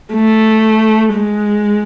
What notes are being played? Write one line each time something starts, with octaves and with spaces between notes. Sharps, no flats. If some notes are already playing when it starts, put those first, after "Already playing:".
A3
G#3